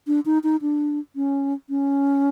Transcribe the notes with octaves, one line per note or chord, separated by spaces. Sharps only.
D4
D#4
D#4
D4
C#4
C#4